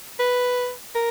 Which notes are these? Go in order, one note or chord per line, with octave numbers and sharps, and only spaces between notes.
B4
A#4